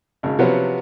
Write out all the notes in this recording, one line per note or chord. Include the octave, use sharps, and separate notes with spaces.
G#1 C#3
C3 F3 F#3 B3 C#4